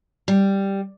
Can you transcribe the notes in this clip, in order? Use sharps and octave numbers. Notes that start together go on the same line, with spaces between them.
G3